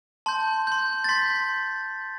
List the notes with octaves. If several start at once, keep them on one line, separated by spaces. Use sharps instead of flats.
A5 C6 G6
C6 G6
A6
C6 G6 B6